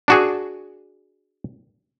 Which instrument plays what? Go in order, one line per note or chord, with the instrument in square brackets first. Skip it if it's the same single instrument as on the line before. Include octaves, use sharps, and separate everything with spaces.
[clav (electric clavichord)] D4 F#4 G#4